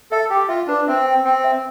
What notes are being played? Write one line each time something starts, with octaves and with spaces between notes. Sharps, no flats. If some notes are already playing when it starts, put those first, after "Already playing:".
A4 E5
G4 G5
F4 E5
D4 B4
C4 E5
G5
C4 G5
E5